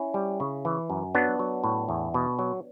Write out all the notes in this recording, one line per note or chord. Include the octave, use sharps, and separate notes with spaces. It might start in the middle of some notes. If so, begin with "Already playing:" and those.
Already playing: C#4 E4
G3
C#3
E3
F#2
F#3 B3 D4
F#3
A2
E2
B2
F#3